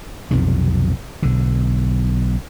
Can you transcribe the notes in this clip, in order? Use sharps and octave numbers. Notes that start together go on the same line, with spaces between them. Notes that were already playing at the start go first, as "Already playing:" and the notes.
B1 F2 C3 D#3
B1 D3